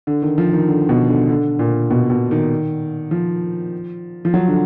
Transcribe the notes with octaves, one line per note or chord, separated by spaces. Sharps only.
D3
D#3
F3
D#3
D3
B2
D3
D3
A#2
B2
B2
D#3
F3
F3
F#3
D3